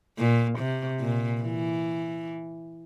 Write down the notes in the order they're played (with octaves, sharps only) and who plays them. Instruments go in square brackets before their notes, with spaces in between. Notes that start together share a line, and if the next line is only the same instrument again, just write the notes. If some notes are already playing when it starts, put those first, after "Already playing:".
[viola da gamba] A#2
C3
A#2
E3